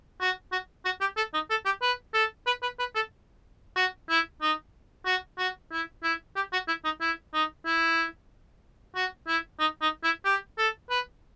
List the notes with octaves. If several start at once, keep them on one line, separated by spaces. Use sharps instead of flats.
F#4
F#4
F#4
G4
A4
D#4
A4
G4
B4
A4
B4
B4
B4
A4
F#4
E4
D#4
F#4
F#4
E4
E4
G4
F#4
E4
D#4
E4
D#4
E4
F#4
E4
D#4
D#4
E4
G4
A4
B4